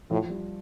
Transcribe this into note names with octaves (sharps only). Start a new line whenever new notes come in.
A2 F3
G3